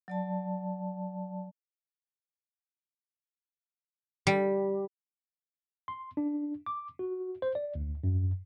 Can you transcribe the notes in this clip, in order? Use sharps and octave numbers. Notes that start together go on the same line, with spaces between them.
F#3 D5 A5
G3
C6
D4
D6
F#4
C5
D5
D2
F#2